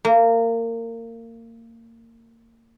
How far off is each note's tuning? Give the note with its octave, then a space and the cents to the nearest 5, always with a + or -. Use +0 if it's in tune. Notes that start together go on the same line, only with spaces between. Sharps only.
A#3 -25